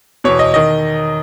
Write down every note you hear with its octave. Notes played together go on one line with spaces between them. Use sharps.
E2 B2 C#5
D#5
D#3 D#5